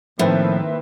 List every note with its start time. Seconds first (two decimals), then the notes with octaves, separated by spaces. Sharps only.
0.19 A2 D#3 F3 A#3 C4 B4 E5